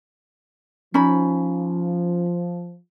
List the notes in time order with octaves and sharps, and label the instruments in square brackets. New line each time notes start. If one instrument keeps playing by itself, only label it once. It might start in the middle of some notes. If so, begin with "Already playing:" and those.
[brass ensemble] F3 [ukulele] C#4 D#4 B5